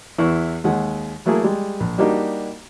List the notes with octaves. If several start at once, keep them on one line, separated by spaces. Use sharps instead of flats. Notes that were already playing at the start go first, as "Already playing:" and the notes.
E2 E4 B4 C#6
D#2 G#3 F#5
F#3 A3 A#3 E4 G#4
G3 G#3
A#1
G3 A#3 D4 D#4 F#4 G4